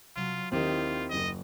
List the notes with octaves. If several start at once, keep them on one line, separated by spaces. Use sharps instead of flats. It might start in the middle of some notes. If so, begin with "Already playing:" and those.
C3 F#3 F4
D#2 D#3 C4 E4 F4 G4
F#1 D#5